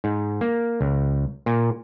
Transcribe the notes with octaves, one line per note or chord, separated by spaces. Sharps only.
G#2
A#3
C#2
A#2